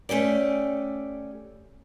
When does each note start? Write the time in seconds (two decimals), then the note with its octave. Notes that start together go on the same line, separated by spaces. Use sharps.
0.09 A3 C#4 G4 D5